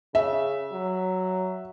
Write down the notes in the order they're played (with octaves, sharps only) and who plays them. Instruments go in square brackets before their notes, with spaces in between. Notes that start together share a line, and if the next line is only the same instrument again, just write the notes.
[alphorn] C#3 [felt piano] E5
[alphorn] F#3